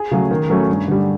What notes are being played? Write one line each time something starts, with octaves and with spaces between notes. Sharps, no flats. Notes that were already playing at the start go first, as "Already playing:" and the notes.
Already playing: G#4
C#3 F#3 A3
D#3
F#3 A3 C#4
G2
D3 G3